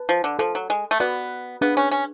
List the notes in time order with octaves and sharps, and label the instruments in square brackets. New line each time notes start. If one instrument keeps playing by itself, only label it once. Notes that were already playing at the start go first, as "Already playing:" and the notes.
Already playing: [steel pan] B4 A5
[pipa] F3
D3
[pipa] F3 [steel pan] A4 F5 A5
[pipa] F#3
G#3
A3
[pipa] B3 [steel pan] F#4 B4 D5
[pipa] B3 [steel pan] D4 G#4 B4 F5
[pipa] C#4
C#4